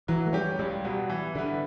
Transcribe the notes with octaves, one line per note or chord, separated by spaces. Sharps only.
E3 F#3
A3
G3 C#4 G4
C#2 G3
B2 F#3 B3
E3
D3 G3 B3 E4 B4